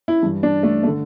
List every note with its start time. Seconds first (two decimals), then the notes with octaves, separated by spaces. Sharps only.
0.08 E4
0.23 G2 E3
0.43 D4
0.63 A3
0.83 A3
0.87 D3